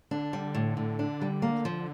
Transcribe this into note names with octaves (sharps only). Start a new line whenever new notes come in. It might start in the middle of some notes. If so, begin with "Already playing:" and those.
D3 D4
G3
A2
A2
D4
G3
A#3
F3